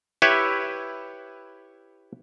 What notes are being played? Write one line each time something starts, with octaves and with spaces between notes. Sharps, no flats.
E4 G4 B4 C#5 E5